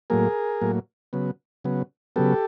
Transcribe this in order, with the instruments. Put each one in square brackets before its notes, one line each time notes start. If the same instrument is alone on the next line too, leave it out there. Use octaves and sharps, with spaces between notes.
[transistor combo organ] A2 F#3 A#3 G#4 A#4
A2 F#3 A#3
C#3 F#3 B3
C#3 F#3 B3
C#3 F#3 B3 G4 A4